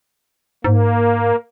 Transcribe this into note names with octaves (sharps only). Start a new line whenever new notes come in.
G#2 A#3